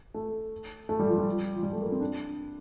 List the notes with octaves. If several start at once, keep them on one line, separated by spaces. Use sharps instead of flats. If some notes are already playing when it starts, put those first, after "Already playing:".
A3
A3
G3
F3
G3
F3
G3
A3
A#3
C4
D4